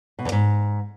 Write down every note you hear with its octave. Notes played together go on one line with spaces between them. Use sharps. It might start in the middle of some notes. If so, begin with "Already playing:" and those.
B2
E2
G#2